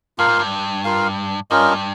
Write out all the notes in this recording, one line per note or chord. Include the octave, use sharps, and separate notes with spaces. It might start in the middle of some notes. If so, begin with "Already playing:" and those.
G2 F4 A#4 F5
G#2
G2
F4 A#4 F5
G2 C#4 F4 A#4 D#5